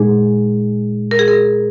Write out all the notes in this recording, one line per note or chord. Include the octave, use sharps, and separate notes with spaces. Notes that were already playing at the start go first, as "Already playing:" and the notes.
Already playing: A#2 G#3 D#4 G#4
A#4
G#4
A#4